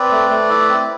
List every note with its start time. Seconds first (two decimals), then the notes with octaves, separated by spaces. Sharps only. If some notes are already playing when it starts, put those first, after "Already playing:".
Already playing: C4 B4 D5
0.12 A3
0.30 A3
0.50 E4
0.69 C4